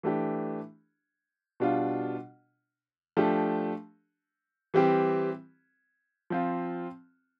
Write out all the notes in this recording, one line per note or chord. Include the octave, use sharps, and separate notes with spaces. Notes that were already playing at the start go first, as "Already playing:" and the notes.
E3 A3 D4 G4
B2 G3 D4 F4
F3 A3 D4 G4
E3 G3 C4 G4
F3 C4 F4